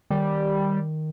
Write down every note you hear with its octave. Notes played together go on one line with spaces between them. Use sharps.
D#3 G3